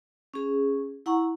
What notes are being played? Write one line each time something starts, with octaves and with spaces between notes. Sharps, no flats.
C#4 G#4
E4 F#5 A#5 C#6